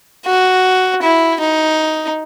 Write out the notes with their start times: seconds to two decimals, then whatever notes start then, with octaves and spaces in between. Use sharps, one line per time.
0.26 F#4
1.02 E4
1.40 D#4